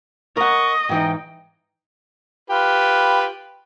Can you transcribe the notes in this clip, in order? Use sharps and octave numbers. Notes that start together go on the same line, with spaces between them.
A#4 D#5 F#5 C#6
G#2 E3 D#4 G5
F4 G4 B4